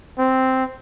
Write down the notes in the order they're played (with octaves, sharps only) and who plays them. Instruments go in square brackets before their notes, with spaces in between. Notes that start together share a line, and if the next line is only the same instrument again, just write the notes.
[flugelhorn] C4